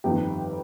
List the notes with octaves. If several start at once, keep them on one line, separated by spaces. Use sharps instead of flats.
G1 F2 D#3 G4